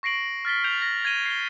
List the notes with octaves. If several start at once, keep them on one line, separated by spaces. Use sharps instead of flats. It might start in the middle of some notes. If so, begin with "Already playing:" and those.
C#6 A#6 C7 D7 F#7
F6 A6 B6 G7
G6 D7 F7
A#6
G#6 A#6 D#7 G7
C7 G7